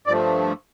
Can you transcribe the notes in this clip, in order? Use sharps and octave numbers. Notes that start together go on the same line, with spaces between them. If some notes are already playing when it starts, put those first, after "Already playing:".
G2 F3 A3 D5